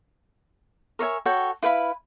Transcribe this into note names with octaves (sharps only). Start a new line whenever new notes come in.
A#4 C#5 E5 G#5
F#4 A4 C#5 G5
E4 B4 F5 B5